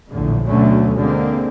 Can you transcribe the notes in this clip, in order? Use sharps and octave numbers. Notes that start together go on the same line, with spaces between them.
A#1 E2 A2 D3
D2 B2 D3 F#3 A3 C#4
D3 G#3 A#3 C4